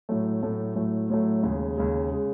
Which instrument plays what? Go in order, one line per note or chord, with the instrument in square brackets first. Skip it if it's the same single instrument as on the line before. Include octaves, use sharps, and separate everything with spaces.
[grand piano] A2 F#3 A3
A2 F#3 A3
A2 F#3 A3
A2 F#3 A3
D#2 C#3 G#3
D#2 C#3 G#3
C#3 G#3